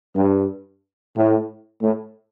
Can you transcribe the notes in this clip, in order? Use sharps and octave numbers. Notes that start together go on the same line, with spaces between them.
G2
A2
A2